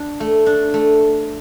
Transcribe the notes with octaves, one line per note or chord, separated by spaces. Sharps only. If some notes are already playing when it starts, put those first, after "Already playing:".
Already playing: D4
A3
D4
A3